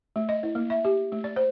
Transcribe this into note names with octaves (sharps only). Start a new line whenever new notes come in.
A3
D#5
E4
A#3
E5
G4
A3
D5
C5